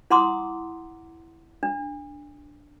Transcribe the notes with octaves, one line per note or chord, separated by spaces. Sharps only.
E4 F#5 A#5 C6 D6 D#6
D4